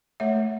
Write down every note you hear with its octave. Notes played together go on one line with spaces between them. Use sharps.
A3 C#5 E5